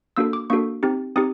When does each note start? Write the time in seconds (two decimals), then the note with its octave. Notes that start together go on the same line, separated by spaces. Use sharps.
0.17 A#3 D4 F#4 A4 E6
0.33 D6
0.50 A#3 D4 F#4 A4 C#6
0.83 C4 D#4 G4
1.16 C4 D#4 G4 D#6